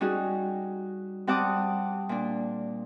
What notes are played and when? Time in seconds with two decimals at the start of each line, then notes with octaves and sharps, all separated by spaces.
0.01 G3 C#4 D#4 F#4 G#4
1.27 G3 C4 F#5 A5 D6 D#6
2.09 A#2 D4